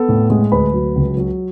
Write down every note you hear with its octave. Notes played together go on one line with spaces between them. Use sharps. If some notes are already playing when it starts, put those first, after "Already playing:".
Already playing: B3 A4
A2
G#3
D2 B4 B5
F#3
C#2
F#3